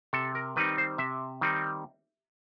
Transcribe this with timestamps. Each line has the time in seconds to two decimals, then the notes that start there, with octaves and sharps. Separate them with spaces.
0.13 C3 A4
0.35 A#4
0.56 D#3 G3 C4 D#4 B4
0.78 C5
0.98 C3 E5
1.41 D#3 G3 C4 D#4